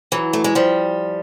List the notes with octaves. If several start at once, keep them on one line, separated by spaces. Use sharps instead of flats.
E3 F#3
A3
G#3
F3 G3